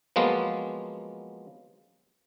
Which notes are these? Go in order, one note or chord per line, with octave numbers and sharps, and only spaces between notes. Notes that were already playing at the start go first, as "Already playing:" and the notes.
F3 F#3 G#3 A#3 B3 F4